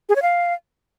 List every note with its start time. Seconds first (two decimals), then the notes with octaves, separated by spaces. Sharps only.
0.09 G#4
0.16 C#5
0.22 F5